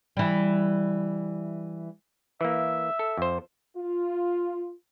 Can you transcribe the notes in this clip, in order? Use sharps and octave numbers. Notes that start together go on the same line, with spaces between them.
E3 G3
E3 A#3 E5
A4
F2 C5
F4